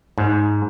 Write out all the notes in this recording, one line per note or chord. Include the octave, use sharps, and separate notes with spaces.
G#2